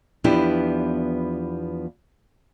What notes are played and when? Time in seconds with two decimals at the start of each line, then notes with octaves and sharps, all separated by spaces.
0.24 E2 F3 B3 D4 E4 G4